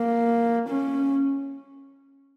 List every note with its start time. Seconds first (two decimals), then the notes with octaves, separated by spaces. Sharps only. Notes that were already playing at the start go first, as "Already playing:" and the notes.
Already playing: A#3
0.69 C#4